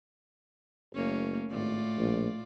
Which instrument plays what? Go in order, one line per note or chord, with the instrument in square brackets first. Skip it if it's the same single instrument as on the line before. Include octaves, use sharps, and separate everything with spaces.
[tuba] F#1 [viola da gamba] A3 A#3 C#4
[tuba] G#1 [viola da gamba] A2 F4 D5
[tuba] A#1